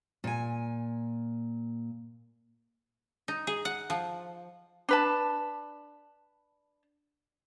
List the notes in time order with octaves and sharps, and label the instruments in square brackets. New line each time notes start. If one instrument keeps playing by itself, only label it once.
[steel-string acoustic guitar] A#2 G#5
[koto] D#4
G#4
F#5
F3
[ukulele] D4 B4 A5